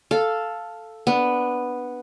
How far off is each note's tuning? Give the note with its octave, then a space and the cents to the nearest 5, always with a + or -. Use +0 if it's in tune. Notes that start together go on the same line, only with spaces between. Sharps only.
A4 +0 F5 +0
B3 +0 D4 +0